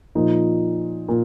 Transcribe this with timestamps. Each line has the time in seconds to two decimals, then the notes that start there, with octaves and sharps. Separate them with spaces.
0.15 A#2 F3 D#4
1.08 A#2